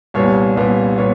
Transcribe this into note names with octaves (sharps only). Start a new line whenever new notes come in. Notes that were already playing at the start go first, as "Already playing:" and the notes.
C2 A#2 G3 B3 C#5
C2 A#2 G3 B3
A#2 G3 B3 C#5